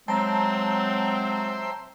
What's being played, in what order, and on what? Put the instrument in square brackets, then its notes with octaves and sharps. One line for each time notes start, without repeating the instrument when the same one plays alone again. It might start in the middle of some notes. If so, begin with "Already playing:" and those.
[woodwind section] F#3 C4 [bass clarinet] G#3 [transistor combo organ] C5 E5 G5 [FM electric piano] A5 A#5